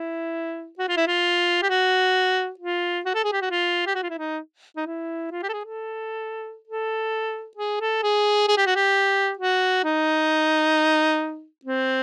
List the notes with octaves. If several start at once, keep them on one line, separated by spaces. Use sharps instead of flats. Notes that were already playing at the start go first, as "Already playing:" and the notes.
Already playing: E4
F#4
F4
E4
F4
G4
F#4
F4
F#4
A4
G#4
G4
F#4
F4
G4
F#4
F4
E4
D#4
D#4
E4
F4
G4
A4
G#4
A4
A4
G#4
A4
G#4
G#4
G4
F#4
G4
F#4
D#4
C4